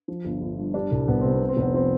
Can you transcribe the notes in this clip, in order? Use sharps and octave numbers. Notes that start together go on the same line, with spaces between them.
F3
G1
G1
G2
G3 D4
C2
C2 B3
C3 C4
B3
C3
C4
F1
B3
F3 C4